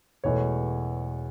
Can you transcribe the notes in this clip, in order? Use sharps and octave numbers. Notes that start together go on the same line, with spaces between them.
E1 E2 B2 A3 C#5